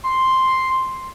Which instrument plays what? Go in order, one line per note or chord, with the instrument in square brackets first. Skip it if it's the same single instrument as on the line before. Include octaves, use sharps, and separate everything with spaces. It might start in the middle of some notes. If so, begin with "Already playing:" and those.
[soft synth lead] C6